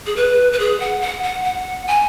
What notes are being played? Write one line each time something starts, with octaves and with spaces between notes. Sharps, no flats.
G#4
B4
B4
G#4
F#5
F#5
F#5
F#5
G#5